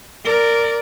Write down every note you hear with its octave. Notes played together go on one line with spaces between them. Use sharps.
A#4 D5